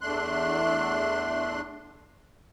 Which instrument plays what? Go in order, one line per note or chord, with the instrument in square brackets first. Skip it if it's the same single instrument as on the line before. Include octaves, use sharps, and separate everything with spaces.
[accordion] E2 A3 D4 C6 F#6